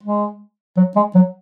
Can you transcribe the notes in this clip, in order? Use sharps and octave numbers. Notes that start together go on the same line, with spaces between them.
G#3
F#3
G#3
F#3